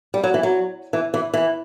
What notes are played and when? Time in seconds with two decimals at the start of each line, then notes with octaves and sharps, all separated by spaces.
0.14 G3
0.24 F#3
0.34 E3
0.43 F#3
0.93 E3
1.14 E3
1.34 E3